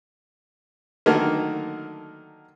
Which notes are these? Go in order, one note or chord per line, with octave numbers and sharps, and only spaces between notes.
D3 D#3 F#3 A3 A#3